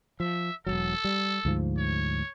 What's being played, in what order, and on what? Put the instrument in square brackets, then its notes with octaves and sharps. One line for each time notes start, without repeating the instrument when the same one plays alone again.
[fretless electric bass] F3 [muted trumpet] E5
[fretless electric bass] E1 C#2 F#3 [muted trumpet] A4
[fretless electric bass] G3
D2 G#2 F3
[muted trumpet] C#5